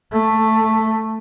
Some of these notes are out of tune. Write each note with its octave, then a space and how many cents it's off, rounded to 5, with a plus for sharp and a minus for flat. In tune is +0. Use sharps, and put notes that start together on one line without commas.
A3 +5